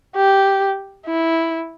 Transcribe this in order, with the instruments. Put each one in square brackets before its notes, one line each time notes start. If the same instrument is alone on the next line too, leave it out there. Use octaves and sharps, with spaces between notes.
[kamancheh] G4
E4